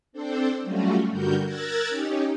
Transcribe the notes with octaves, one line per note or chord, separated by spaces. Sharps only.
C4 D4 A4 C5
F#3 G3 A3 C#4 F4 F#4
G2 D3 G3 F#4 A#4 G6
A#4 A#5 E6 F#6 G#6 A6
C#4 D#4 G4